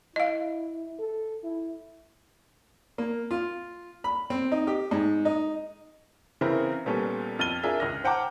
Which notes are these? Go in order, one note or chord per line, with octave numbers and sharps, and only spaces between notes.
E4 D#5 F5
A4
E4
A#3
F4
B5
C4
D#4
G4
G#2
D#4
C#3 E3 C4 E4 A#4 B4
A#2 G3 B3 C#4 A4
F2 F6 A6 D#7 G7
D4 F4 G#4 A#4 E5
C#2 F6 A#6
C5 F#5 G5 A5 A#5 D6